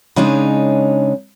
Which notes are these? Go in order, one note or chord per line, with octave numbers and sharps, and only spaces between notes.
C#3 G#3 D4 D#4 C#5 G#5